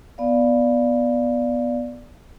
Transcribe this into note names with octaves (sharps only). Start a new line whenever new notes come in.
B3 D5 F5